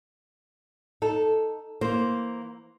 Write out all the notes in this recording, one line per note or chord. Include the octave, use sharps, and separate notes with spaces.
D#4 A4
E3 A#3 C5